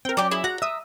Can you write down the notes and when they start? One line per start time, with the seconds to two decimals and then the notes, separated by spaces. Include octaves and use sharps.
0.05 C4 A#4 G5
0.17 F#3 C#4 G4 D5
0.31 E4 G#4
0.44 F#4 A#5 F#6
0.62 E5 D#6 E6